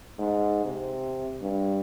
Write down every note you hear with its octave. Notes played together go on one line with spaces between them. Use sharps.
G#2
C3
G2